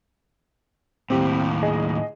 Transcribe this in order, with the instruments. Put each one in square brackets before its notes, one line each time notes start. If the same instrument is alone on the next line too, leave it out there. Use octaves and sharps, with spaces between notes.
[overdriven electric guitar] D#2 A2 [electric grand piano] C4 G4
[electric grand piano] G#4 D#5